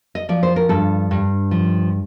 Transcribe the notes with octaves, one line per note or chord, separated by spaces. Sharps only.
D#5
F3 D5
C5
A#4
G2 A4
G2
F3